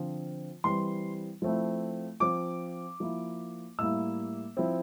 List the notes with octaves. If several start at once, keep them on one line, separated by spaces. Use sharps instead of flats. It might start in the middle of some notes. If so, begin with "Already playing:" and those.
Already playing: D3 F3 C4 F4
E3 G3 C4 C6
F3 A3 C4 E4
F3 C4 F4 D6
F3 A#3 E4
A2 G3 A#3 E4 E6
F3 C4 E4